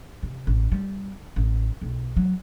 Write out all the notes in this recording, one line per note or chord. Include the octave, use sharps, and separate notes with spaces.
C3
A1
G3
A1
B1
F#3